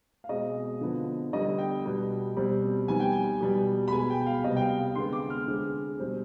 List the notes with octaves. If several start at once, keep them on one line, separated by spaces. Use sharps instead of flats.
F5
B2 G#3 C4 D#5
D3 F3 B3
D3 G3 B3 D#5
G5
B2 G3 B3
B2 G3 C4
D#3 G3 B3 G#5
G5
G#5
B2 G3 B3
B5
B2 G#3 B3 G#5
G5
G5
F5
C3 G3 B3 D#5
G5
F5
G5
D3 G#3 B3 C6
D6
F6
D3 G#3 C4
B2 G3 C4